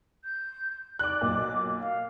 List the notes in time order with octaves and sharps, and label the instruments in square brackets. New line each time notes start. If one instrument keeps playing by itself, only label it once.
[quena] G6
[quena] D5 [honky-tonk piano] D6 F#6
[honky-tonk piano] B1 A#2 [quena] D6
[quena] F5